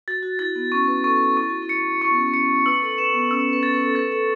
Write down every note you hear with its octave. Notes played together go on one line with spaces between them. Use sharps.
F#4 A6
F#4
E4 A6
B3
C#4 C#6
B4
A4 C#6
F#4
E4 C#6
F#4
E4
C#7
E4 C#6
B3
C#4
C#4 C#7
B4 E6
A4
B4 E7
B3
C#4 E6
B4
A6
B4
A4
B4 A6
A4